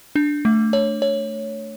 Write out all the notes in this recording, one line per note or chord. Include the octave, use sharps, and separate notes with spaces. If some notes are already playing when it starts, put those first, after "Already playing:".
D4
A3
C#5
C#5